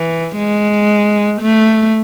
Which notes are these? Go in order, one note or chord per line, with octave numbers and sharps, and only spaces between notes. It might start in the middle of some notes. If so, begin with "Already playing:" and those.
Already playing: E3
G#3
A3